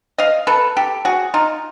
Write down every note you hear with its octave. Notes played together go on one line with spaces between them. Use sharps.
D#5 F5
A4 B4
G4 A4
F#4 G#4
D#4 F4